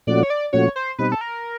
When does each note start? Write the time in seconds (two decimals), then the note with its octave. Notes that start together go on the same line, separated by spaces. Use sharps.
0.07 A#2 F3 A3 C#4 F#4 D5
0.23 C#5
0.30 D5
0.53 A#2 F3 A3 C#4 F#4 C#5
0.76 C5
0.98 B2 G3 C4 D#4 B4
1.12 A4
1.21 A#4